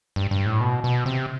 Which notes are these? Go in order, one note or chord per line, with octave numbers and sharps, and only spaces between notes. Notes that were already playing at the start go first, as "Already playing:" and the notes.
G2
G2
A2
B2
B2
C3